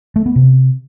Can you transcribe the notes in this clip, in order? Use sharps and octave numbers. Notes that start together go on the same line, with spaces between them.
A3
B3
C3